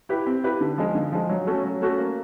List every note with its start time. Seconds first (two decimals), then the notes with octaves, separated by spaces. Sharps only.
0.09 E4 G4 B4
0.26 C4
0.43 E4 G4 B4
0.61 D3
0.78 F3 G#3
0.95 D3
1.12 F3 G#3
1.29 F#3
1.47 A3 C#4 F#4 A4
1.64 F#3
1.81 A3 C#4 F#4 A4
1.98 A#3